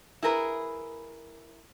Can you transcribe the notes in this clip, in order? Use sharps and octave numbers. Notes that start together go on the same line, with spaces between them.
E4 G#4 A#4 B4